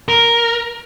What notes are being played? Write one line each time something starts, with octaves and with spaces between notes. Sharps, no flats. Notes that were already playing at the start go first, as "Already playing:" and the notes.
A#4